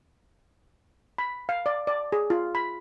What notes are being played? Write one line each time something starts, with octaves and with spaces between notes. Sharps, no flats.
B5
F5
D5
D5
G#4
F4
B5